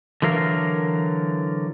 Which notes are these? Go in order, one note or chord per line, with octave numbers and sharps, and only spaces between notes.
D3 E3 F#3 A#4 F5